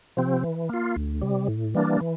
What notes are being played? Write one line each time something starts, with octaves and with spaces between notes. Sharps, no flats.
C3 F3 C4
E3
A#3 F4
D2
C3 G3
A2
E3 G3 A#3 D4
E3